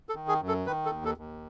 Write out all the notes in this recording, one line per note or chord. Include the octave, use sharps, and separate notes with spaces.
A4
D#3
G#4
F#2
A4
D#3 B4
A4
D#2
A4
D#2